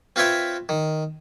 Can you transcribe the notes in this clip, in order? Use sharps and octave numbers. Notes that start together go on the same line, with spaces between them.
C4 F4 B4 C#5 E5 G5
D#3